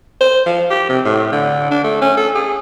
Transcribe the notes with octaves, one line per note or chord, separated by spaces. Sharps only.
C5
F3
G4
C3
A2
D3
D4
A3
C#4
A4
G#4